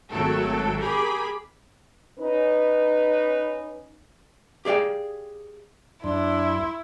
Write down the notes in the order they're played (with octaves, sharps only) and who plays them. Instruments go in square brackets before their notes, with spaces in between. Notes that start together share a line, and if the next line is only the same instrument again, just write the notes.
[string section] G#1 F#3 A3 A4 G5
G4 G#4 A#4 B5 D6
[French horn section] C#4 D#4 B4
[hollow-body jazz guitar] G4 G#4 D5 F5 G5
[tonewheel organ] F#2 [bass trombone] D4 [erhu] E4 [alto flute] C6